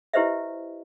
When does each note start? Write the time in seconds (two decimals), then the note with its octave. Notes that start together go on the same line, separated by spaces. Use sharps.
0.13 E4 G4 B4 C5 D#5 E5